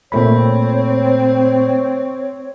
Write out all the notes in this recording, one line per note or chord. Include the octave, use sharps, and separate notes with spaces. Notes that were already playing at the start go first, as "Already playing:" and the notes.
A#2 A3 C4 C#5 B5